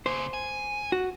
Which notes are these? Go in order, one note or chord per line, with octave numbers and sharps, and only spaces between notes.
C#3 A#3 C5
G#5
F#4